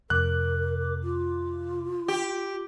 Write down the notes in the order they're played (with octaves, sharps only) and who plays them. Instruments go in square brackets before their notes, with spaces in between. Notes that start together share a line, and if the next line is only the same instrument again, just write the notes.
[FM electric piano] F2 C3 D6 [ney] A#4 [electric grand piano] F#6
[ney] F4
[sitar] G4